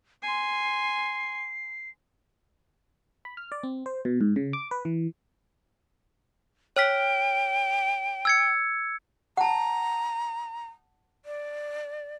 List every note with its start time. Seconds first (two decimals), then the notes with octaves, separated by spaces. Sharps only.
0.23 G#5 C6 C7
3.25 B5
3.37 F6
3.52 D5
3.63 C4
3.86 C5
4.05 B2
4.21 G#2
4.36 C#3
4.53 D6
4.71 B4
4.85 E3
6.76 C#5 G5 F6 B6
8.25 E6 G#6 C#7
9.37 F#5 A5 A#5
11.25 D5